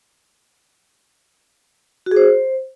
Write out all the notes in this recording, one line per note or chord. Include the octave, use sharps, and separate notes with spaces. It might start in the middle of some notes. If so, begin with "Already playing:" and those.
F#4
G#4
C5